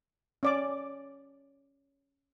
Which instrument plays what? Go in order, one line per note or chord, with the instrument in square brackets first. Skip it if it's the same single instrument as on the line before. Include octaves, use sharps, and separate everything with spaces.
[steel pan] C#4 D5 D6